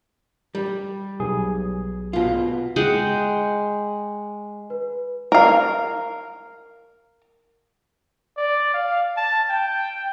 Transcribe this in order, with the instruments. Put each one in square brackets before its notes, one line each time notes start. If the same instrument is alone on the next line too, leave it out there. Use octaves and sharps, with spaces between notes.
[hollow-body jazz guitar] G3
[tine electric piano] B1 G#4
[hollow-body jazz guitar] B2 F4
[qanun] G#3 F#5 G5
[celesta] B4
[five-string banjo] A#4 F5
[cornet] D5
F5
A5
G5